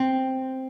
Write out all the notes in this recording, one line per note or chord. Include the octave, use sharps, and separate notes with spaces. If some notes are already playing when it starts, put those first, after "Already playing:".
Already playing: C4